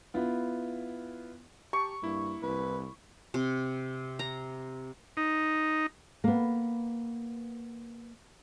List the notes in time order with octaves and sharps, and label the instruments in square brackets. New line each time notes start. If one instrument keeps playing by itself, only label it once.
[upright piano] B3 E4 F4
[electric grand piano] G4 A5 [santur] C#6
[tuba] G2 [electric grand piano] A#3 E4
[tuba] C2 [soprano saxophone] B4
[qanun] C3
A#5
[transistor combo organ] D#4
[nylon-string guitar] A#3 B3